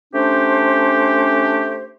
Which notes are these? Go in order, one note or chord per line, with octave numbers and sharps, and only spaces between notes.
A3 C#4 D4 G4 C5